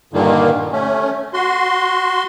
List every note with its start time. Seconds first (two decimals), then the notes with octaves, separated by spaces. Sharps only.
0.13 G2 A#2 D3 D#3 A#3
0.72 A3 C#4
1.34 F#4 C6